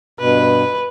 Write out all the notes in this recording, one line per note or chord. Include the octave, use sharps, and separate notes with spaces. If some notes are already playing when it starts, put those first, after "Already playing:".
G2 B2 B4